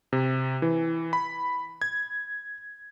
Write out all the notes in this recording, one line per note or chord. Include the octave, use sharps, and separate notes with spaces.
C3
E3
B5
G#6